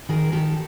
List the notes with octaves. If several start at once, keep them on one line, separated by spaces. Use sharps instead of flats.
D#3 G#4 A#4
D#3 G4 A4